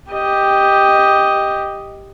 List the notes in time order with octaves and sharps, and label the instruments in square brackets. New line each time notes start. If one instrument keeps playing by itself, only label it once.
[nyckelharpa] G4 D#5